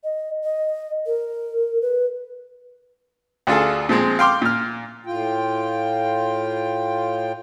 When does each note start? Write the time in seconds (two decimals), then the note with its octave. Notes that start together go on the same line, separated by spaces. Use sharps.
0.04 D#5
0.44 D#5
1.06 A#4
1.82 B4
3.47 D2 D4 F4 G#4 A4
3.89 A#2 F3 G#3 C4
4.19 F5 G5 C6 D6 F6
4.42 A#2 F6
5.06 A2 F4 G5